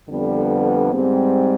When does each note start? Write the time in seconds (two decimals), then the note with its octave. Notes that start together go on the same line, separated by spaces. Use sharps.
0.09 F2 D3 G3 B3
0.93 G#2 G3 C4